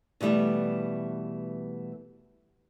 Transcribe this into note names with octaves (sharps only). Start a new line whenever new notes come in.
B2 E3 G3 A3 B3